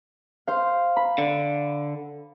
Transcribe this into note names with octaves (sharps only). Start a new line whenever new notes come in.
C5 F5
B5
D3